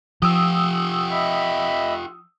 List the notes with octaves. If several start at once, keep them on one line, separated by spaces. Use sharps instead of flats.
F3 F4 G4 D#6 E6
D#5 E5 B5